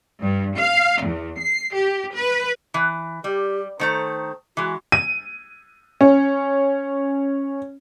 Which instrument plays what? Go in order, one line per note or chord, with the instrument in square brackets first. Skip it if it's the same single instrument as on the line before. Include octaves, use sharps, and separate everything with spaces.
[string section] G2
F5
E2
C7
G4
B4
[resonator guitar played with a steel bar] E3
[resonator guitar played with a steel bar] G3 [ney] G4
[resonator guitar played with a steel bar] D#3 A3 A#5 [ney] C5
[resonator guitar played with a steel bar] E3 G#3 [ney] F#4
[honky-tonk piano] D#7
C#4